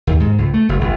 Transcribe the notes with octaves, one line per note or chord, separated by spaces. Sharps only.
D#2
G#2
C#2
A3
F#1
G1